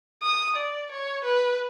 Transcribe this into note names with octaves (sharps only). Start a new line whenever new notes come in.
D#6
D5
C#5
B4